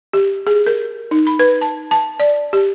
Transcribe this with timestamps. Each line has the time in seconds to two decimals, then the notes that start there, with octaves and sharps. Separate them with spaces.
0.13 G4
0.47 G#4
0.67 A#4
1.11 D#4
1.27 B5
1.39 B4
1.61 A5
1.91 A5
2.20 D5
2.53 G4